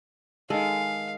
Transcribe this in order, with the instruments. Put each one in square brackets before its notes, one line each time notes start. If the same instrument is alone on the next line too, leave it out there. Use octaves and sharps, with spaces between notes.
[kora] D#3 A4 [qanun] G#3 [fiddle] F5